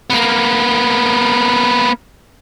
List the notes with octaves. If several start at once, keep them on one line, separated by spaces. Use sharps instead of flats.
A#3 B3